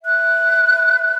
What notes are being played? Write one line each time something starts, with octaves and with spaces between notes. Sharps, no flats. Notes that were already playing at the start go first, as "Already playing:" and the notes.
E5 F#6